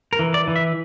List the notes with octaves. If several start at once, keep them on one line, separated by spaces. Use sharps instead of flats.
A#4
E3
D5
E3
E5